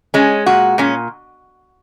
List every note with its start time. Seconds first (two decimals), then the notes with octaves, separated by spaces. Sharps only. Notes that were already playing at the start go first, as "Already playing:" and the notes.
0.14 G#3 C#4
0.46 A#2 F#4
0.78 A#2 C#4